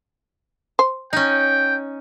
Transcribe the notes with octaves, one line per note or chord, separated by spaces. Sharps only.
C5
C#4 D#4 G5